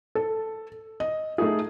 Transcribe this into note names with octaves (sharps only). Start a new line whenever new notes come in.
A4
D#5
A3 D#4 G#4